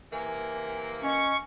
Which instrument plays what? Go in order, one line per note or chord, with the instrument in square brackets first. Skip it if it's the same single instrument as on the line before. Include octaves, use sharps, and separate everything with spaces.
[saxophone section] C3 E3 A#3 [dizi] G#5
[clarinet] C#4 [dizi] D#5 [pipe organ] C#6